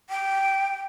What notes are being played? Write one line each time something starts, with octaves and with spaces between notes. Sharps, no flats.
G5